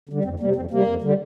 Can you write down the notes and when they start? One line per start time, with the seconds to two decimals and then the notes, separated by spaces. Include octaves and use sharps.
0.09 D3 G3
0.24 F2 C4
0.40 C3 G3 A#3
0.56 F2 C4
0.71 C3 G3 A#3
0.86 F2
1.02 D3 G3